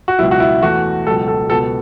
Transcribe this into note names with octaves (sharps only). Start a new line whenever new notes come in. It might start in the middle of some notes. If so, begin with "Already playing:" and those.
F#4
C#2 B2 F#3 E4
F#4
E4
E2 E3 A3 F#4
C#2 B2 F#3 A4
A4
C#2 B2 F#3 B3 A4